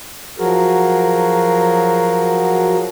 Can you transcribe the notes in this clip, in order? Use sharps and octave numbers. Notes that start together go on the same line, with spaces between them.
F3 F#3 F#4 G#4 A#4